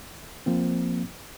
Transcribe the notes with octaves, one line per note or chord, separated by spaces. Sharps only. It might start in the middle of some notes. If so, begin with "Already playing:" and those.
F3 A#3 C4